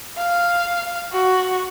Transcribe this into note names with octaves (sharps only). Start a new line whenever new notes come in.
F5
F#4